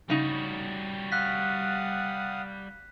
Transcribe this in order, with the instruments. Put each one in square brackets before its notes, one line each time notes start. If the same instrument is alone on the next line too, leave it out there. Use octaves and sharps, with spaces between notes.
[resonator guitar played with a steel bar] C#3 D#4 [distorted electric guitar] G3 F#4
[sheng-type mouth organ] F5 F#5 D#6 [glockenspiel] F#6 B6